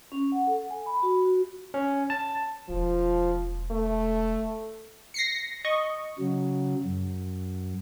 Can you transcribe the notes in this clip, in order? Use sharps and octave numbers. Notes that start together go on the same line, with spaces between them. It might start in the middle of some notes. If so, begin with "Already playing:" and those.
C#4
F#5
A4
G#5
B5
F#4
F#4
C#4
A5
E1 F3
A3
A#6 C7 C#7
D#5 C#6
C#3 F#3
F#2